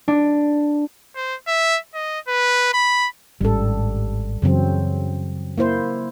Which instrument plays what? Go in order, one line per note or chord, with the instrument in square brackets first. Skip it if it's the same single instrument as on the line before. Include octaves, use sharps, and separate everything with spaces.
[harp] D4
[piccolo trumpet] C5
E5
D#5
B4
B5
[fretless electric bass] G#1 A2 C#4 [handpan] G3 A4
[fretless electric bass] F#2 E3 [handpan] C#3 F#3 C4
[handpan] A#3 E4 C5